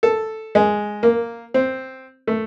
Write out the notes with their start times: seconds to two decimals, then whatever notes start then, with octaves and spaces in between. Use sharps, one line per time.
0.03 A4
0.55 G#3
1.03 A#3
1.54 C4
2.28 A3